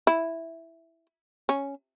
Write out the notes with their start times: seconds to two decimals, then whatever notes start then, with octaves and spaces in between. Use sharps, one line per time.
0.07 E4
1.49 C#4